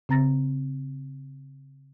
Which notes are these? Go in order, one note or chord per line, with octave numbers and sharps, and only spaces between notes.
C#3 C4 A#5 A6 A#6